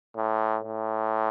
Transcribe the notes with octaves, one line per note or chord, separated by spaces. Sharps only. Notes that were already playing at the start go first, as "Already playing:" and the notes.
A2
A2